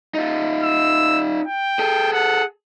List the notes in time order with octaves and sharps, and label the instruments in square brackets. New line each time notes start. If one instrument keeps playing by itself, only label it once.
[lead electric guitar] D#4 F4
[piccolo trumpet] E6
G5
[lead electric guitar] G#4 A4
[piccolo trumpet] F#5